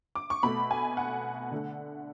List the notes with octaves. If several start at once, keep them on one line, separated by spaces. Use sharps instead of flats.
D6
C#6
B2 A3 B5
G#5
F#5
D3 A3